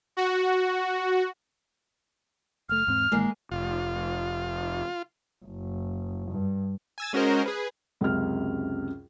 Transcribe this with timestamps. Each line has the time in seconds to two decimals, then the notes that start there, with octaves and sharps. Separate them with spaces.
0.17 F#4
2.69 F#1 A3 F6
2.87 E2 G#2 C4
3.12 A1 D#3 G#3 A#3
3.51 F1 F4
5.44 F#1
6.31 G2
6.98 G#5 E6 A6
7.13 G#3 C#4 F#4 A#4 C5 D#5
7.46 G#4 B4
8.01 C#2 F#2 C3 F6